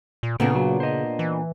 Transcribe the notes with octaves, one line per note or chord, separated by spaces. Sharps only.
A#2
A#2 C#3 B3 C4 D4 A4 A#4
F#3
C5 D#5
E3